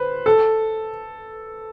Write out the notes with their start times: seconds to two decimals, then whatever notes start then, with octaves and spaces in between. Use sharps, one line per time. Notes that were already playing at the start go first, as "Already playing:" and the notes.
Already playing: B4 C5
0.26 A4